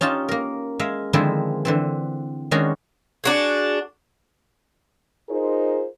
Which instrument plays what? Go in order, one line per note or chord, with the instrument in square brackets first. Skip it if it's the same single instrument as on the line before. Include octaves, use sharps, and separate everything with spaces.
[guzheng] C#4 D#4 F4 G4 A5
A#3 A#4
G#3 E5 F5
D3 D#3 F3 G#3 C4 E4
D3 E3 C4
D#3 G#3 C#4 D4 F#4 G#4
[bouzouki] D4 F#4 G#4
[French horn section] D#4 F4 G#4 A#4 C5